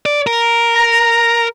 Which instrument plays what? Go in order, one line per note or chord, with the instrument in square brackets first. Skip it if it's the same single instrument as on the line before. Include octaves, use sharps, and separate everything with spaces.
[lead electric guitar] D5
A#4
[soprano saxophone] A#5